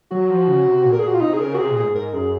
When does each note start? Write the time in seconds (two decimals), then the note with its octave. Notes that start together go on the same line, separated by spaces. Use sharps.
0.11 F#3 F#4
0.30 F3
0.48 C#3
0.67 C3
0.85 A#2
0.92 A#4
0.99 G#4
1.03 A#2 F#4
1.14 F4
1.21 C3 D#4
1.34 G#4
1.40 C#3 A#4
1.54 F#4
1.58 C3 G#4
1.71 A#2
1.76 G#4
1.83 G#2
1.95 G#2 A#4
2.13 F#2 G#4